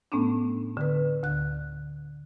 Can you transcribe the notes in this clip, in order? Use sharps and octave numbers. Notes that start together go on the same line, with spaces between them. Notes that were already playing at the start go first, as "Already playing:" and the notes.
A2 A3 B3 C#4 D4
D3 B4
D2 D3 F#6